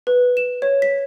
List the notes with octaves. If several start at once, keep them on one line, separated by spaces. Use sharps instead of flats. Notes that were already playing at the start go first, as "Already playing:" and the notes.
B4
E7
C#5
B6